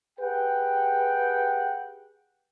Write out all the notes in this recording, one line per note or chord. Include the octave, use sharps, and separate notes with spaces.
G4 G#4 B4 F#5 G5